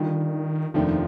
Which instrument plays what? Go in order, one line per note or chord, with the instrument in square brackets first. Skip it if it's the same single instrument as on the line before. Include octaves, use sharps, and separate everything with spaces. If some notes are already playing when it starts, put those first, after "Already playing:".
Already playing: [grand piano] D3 G3 D4 F4 [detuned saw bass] D#3
[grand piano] F1 D#2 D#3 A3 D4 [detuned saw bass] F3